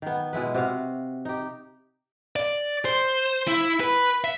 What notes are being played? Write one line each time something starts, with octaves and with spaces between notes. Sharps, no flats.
D#3 B3
B2 G#3 E4 B4
C3 F#4 F5
D#4 G4
D5
C5
E4
B4
E5